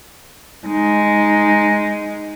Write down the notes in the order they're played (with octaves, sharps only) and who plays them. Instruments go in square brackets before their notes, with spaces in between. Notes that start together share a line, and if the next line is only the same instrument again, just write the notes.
[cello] G#3 D#4